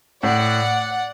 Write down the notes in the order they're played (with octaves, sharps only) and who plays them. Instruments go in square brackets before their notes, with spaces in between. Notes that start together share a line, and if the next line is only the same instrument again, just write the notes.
[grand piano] A2 [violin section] D5 F#5